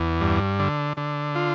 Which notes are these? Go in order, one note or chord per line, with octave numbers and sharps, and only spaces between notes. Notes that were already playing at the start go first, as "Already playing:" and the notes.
Already playing: E2
G2
D3
D3
F4